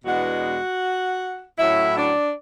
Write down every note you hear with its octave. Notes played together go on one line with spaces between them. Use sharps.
E2 B2 G#3 B3 D4 F#4 F#5
A2 F#3 C#4 E4 E5
D4 D5